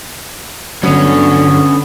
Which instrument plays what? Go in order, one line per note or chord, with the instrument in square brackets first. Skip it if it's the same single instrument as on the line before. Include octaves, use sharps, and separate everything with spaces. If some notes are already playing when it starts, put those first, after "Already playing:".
[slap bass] G1 F#3 [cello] D3 [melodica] B3 [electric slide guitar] C#4 C#5